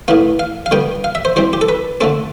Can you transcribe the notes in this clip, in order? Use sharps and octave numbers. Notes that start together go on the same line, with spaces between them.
A2 E3 B3 F5
F5
F5
D3 G3 B3 G5
F5
E5
C5
E3 G3 C4 C5
G4
A4
B4
D3 A3 C4 A4